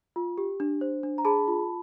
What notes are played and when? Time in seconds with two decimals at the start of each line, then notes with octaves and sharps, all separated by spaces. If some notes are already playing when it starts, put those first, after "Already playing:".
0.16 F4
0.38 G4
0.60 D4
0.81 C5
1.03 D4
1.18 A#5
1.25 G#4 A5 B5
1.48 F4